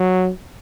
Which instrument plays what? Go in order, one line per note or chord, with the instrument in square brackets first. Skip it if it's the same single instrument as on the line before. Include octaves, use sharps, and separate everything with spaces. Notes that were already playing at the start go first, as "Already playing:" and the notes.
Already playing: [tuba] F#3